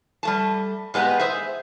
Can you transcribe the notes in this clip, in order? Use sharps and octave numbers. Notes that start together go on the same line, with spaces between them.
G3 A3 A5
A#2 G#3 B3 G4 A#5
G#4 C5 E5